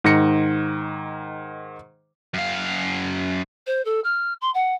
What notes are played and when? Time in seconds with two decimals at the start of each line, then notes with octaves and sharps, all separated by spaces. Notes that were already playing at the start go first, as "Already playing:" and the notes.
0.04 G#2 D#3 A#6 C#7
2.34 F#2 F5
3.66 C5
3.85 A4
4.04 F6
4.41 C6
4.54 F#5